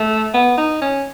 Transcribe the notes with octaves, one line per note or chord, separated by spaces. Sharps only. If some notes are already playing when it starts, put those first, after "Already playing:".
Already playing: A3
B3
D#4
C#4